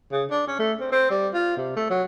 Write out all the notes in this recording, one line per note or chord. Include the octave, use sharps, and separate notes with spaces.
C#3
D4
C#4
A3
C4
C4
G3
F4
C3
A3
F#3